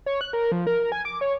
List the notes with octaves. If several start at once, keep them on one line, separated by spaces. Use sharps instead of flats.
C#5
F#6
A#4
F3
A#4
G#5
D6
C#5